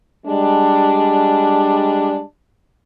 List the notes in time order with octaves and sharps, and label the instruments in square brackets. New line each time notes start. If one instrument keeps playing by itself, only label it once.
[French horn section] G3 G#3 D4